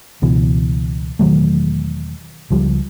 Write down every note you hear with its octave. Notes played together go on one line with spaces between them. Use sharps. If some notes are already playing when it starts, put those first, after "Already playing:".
C#2 B2 E3
E1 D#3 F#3 A3
C#2 F3 G3